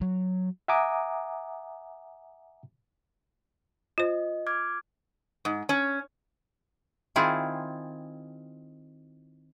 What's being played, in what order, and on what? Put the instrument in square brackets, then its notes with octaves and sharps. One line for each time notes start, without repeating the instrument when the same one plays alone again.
[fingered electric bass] F#3
[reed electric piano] E5 F#5 G#5 A#5 D6 D#6
[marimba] F4 C5 [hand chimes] D#5
[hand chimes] D6 F6 G#6
[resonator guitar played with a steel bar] G#2
C#4
[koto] D#3 C4 E4 F4 G#4